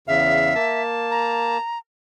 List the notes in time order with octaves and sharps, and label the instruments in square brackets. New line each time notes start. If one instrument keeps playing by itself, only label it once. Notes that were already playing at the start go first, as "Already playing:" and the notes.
[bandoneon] E2 C#3 F5 [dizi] E5
[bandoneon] A#3 A5
[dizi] A#5